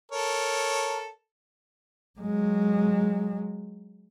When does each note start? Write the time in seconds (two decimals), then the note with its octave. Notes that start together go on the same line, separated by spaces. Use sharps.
0.12 A4 A#4 C#5
2.20 F#3 G#3